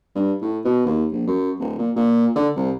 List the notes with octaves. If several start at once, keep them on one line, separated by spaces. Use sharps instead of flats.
G2
A2
B2
D#2
A#1
F#2
D1
A#2
A#2
D3
C2